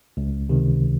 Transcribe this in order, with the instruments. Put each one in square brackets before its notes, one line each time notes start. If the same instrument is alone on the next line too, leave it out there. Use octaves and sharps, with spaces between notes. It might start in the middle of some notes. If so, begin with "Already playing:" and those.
[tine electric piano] C#2
C3 D#3